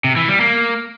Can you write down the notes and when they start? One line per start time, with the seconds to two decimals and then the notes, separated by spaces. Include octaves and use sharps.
0.04 C3
0.16 E3
0.28 G3
0.40 A#3